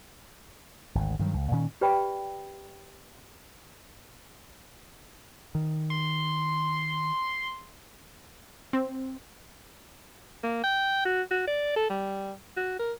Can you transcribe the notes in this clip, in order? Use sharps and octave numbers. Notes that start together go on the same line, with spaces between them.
G#1 D2
G2 D#3 F#3
C#2
A#2 D#3 C#4
G4 B4 D5 G5 B5
D#3
C6
C4
A#3
G5
F#4
F#4
D5
A4
G3
F#4
A#4